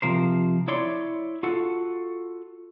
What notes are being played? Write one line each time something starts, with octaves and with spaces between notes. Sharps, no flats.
C3 F3 A#4 C5
E4 C#5 D5 C6
F4 F#4 A4 F#5